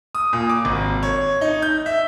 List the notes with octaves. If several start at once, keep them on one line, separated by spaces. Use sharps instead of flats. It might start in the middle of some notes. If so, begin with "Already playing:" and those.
D#6
A#2
D6
G#1
C#5
D#4
G6
E5